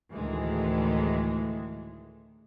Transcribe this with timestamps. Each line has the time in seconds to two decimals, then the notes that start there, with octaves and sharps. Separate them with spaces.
0.13 D2 A2 D#3 E3 G#3